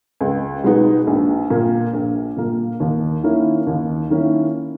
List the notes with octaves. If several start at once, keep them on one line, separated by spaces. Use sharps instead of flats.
C#2
B2 G#3 B3 D#4
A#1
A#2 A#3
A#1
A#2 A#3
D#2
D#3 A#3 C#4 E4
D#2
D#3 A#3 C#4 E4